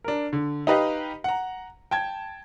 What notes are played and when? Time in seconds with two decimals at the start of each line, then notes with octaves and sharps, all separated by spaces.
0.04 D4 A#4
0.33 D3
0.67 D#4 G4 B4 D#5 F5
1.24 F#5 A#5
1.91 G5 A5 G#6